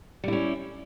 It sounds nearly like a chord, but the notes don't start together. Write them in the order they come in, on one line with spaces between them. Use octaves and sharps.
G3 E4 C#4